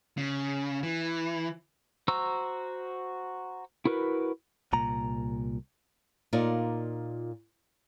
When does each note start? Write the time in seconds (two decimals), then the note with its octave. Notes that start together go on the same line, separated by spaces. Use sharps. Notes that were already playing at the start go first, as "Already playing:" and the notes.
0.17 C#3
0.83 E3
2.08 F#4 C5 A#5 C#6 E6
3.85 E4 F#4 A#4 B4
4.73 C2 A#2 A#5
6.33 A#2 D#4 F4 A#4 D5